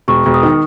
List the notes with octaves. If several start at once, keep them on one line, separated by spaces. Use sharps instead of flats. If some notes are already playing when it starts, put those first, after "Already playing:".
E1 C#6
E1
D#6
D#3